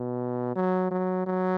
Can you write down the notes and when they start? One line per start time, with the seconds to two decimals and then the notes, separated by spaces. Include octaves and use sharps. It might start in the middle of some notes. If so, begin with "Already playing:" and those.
Already playing: B2
0.56 F#3
0.91 F#3
1.26 F#3